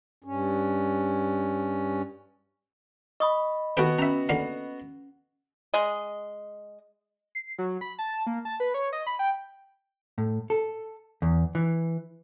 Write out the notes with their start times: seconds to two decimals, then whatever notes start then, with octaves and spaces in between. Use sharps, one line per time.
0.24 G2 C#4
3.20 D#5 B5 C#6 D#6
3.77 D#3 A3 B3 F#4 G5
3.99 C#4 E5 A#5
4.29 E2 D3 A#3 F#5
5.74 G#3 D#5
7.35 C7
7.58 F#3
7.81 B5
7.99 A5
8.27 A#3
8.45 A5
8.60 B4
8.74 C#5
8.93 D#5
9.06 B5
9.19 G5
10.18 A2
10.50 A4
11.22 E2
11.55 E3